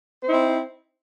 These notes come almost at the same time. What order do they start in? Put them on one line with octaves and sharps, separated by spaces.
C5 E4 D#4 C4